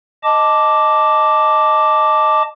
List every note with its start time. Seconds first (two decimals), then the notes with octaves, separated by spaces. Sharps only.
0.24 D#5 A5 D6